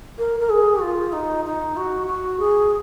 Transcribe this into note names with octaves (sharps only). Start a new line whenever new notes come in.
A#4
A#4
G#4
F4
D#4
D#4
F#4
F#4
G#4